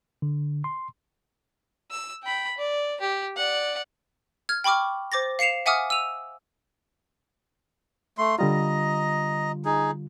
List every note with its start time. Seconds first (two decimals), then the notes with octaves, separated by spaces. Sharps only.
0.22 D3
0.64 C6
1.91 E6
2.24 G5 B5
2.58 D5
3.01 G4
3.37 D5 F#5
4.49 F6 G#6
4.64 G5 B5 C#6 D6 F6
5.12 C5 D6 A6 A#6
5.39 F5 C7 C#7 E7 F7
5.66 E5 F#5 G#5 D6 D#6 F6
5.90 E6 D#7 F7
8.18 A3 C6
8.39 D3 G3 F4 D#5 A#5
9.65 D#4 G#4